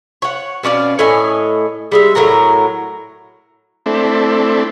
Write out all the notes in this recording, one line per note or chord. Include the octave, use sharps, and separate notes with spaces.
C#5 F#5
B2 C#4 D5 F5
A2 C#5 D#5 G#5
G3 G#3 E5
A2 F#3 A#4 A#5
A3 C4 D4 E4